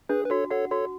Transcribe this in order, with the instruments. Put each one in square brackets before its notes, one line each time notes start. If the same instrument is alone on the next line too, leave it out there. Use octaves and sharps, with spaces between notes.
[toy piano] D4 [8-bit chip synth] G#4 B4
[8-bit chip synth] B4
[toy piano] F#4 [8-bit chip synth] A4 C#5
[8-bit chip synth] A4 C#5 [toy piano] F#5
[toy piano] F#4 [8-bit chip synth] A4 C#5